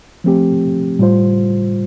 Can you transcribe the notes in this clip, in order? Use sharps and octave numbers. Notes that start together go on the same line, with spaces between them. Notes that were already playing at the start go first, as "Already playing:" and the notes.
F3 A3 C4 G4
A2 G3 F4 C5